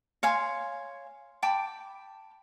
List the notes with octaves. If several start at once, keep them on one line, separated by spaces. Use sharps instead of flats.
C#5 F5 G#5 C6
G5 A5 B5 D6